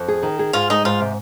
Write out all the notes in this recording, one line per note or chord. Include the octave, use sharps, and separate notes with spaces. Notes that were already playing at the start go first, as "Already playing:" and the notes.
Already playing: F2
G#4
D#3
G#4
G#2 F4
G#3 D#4
G#2 F4
C3